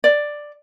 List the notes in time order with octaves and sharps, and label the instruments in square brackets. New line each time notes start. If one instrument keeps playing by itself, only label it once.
[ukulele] D5